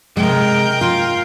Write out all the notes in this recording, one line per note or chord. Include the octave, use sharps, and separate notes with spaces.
C3 G#3 A#4 G5
F4